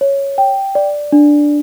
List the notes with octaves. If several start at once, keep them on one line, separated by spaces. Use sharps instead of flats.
C#5
G5
D5
D4